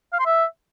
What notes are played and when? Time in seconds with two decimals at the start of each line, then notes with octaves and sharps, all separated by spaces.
0.13 F5
0.19 C6
0.26 E5